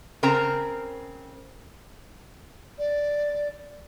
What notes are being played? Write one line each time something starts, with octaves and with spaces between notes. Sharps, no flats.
C#3 C4 A#4 A5 A#5
D5